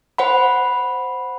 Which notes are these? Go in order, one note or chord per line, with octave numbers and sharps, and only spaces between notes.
C5 F#5 B5